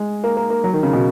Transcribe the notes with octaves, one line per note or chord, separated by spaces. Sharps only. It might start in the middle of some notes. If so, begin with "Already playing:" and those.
Already playing: G#3
A#3
A#3
A#3
F#3
D#3
C#3
B2